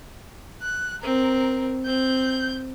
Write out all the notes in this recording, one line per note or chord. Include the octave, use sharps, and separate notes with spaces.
F#6
C4 A#4
C4 G6